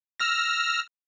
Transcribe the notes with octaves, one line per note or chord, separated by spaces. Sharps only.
E6 F6 A#6